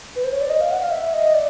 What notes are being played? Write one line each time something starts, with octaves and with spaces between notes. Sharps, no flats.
B4
C5
C#5
D5
D#5
F5
F#5
F5
E5
D#5
D5